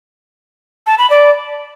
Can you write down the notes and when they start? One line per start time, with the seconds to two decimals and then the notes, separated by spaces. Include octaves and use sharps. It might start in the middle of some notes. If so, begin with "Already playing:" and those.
0.87 A5
0.98 B5
1.10 D5